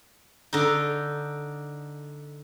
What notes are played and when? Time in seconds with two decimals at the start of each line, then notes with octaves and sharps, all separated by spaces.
0.53 D3 D#4